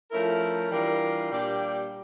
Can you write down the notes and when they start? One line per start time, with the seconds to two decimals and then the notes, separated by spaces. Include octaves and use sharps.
0.11 F3 A3 C#4 E4 A#4
0.71 E3 G3 D4 F4 A#4
1.31 A#2 G3 A#3 D4 G4